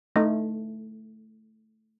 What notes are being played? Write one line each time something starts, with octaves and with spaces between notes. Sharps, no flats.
A3 D#4 D#5 A#6